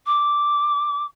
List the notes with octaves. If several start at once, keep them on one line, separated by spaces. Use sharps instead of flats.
D6